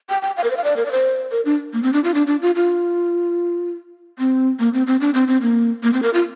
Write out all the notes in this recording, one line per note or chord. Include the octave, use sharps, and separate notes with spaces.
G5
G5
F5
A#4
C5
F5
D5
A#4
D5
C5
A#4
D4
A#3
C4
D4
F4
D4
D4
F4
F4
C4
A#3
C4
C4
D4
C4
C4
A#3
A#3
C4
A#4
F4